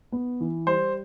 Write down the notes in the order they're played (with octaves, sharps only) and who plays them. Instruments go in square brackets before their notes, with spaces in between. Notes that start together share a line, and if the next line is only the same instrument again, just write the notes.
[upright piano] B3
E3
[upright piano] G3 [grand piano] C5